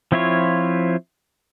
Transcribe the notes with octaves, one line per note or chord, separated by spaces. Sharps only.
F3 C4 E4 F4 C#5